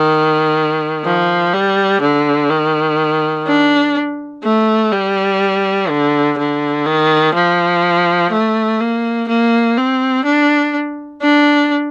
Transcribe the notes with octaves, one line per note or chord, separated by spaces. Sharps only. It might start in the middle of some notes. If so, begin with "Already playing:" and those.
Already playing: D#3
F3
G3
D3
D#3
D4
A3
G3
D3
D3
D#3
F3
A3
A#3
A#3
C4
D4
D4